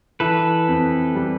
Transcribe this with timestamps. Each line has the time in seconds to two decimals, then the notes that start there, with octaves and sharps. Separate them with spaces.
0.20 E3 A4 B4
0.68 F2
1.15 G3